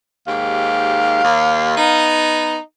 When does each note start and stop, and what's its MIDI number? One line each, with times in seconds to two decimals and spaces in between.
0.27 1.23 39
0.27 1.23 44
0.27 1.23 67
0.27 2.17 77
1.24 1.73 39
1.77 2.58 59
1.77 2.58 63